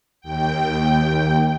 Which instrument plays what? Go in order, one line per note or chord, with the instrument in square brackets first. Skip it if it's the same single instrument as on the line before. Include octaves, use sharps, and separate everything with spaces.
[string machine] D#2 G5